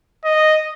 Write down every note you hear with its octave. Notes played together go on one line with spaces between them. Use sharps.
D#5